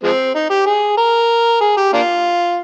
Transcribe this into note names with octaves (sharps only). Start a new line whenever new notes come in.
F3 G#3 C4
D#4
G4
G#4
A#4
G#4
G4
A#3 D4 F4